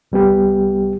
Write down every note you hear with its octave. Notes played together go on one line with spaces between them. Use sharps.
C2 G3 B3 G4